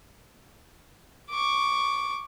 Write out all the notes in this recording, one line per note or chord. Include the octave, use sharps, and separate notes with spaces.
C#6 D6